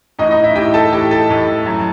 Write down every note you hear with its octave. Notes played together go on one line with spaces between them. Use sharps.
A2 E3 D#4 D#5
D#4 D#5
E4 E5
A2 E3 G4 G5
A4 A5
A2 E3 G4 G5
A4 A5
A2 E3
F#2 E3